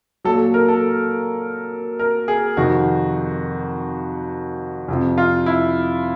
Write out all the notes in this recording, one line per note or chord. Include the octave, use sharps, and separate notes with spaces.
A#2 F#3 A4
A#4
A4
A#4
G#4
F2 C3 D#3 F#4
F2 C3 F3
F4
E4